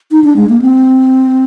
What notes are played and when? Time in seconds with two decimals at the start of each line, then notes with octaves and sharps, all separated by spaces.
0.12 D#4
0.24 D4
0.36 G#3
0.49 A#3
0.62 C4